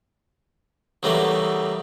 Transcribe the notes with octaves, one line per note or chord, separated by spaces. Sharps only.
E2 C#3 F#3 G3 A3 A#3